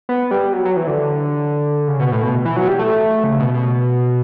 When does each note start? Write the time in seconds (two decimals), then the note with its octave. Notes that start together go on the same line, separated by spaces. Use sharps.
0.09 B3
0.31 G3
0.53 F#3
0.65 F#3
0.76 E3
0.87 D3
1.88 C#3
2.00 B2
2.12 A2
2.23 B2
2.45 E3
2.56 F#3
2.68 G3
2.79 A3
3.24 C#3
3.39 B2
3.54 B2